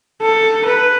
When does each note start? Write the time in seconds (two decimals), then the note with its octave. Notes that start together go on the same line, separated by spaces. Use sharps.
0.22 A4
0.66 B4